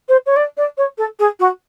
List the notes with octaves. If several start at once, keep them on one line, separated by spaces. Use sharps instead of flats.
C5
C#5
D5
D5
C#5
A4
G#4
F#4